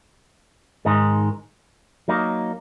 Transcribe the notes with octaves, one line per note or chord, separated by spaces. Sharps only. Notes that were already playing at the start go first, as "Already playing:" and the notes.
G#2 D#3 G#3 D#4
F#3 A#3 D#4